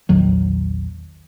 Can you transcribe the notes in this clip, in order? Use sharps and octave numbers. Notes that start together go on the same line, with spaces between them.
A#1 E2 D#3 F#3